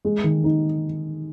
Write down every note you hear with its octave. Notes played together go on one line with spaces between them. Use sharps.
G#3
D#3
D#4